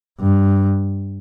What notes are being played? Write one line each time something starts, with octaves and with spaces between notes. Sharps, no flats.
G2